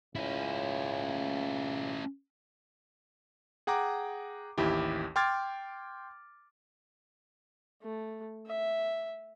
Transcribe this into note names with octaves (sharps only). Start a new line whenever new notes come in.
C#2 C#4 E4
G#4 F#5 G5 A#5 D6
A1 D#2 E4 G4
G5 C6 D6 F6 G#6 A6
A3
E5